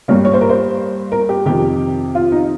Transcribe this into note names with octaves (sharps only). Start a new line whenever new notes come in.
G2 G3 A#3 C#5
C#5
C5
A#4
C5
A#4
G4
F2 C3 D#3 G4
F4
D#4